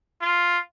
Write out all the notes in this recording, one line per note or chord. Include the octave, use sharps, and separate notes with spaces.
F4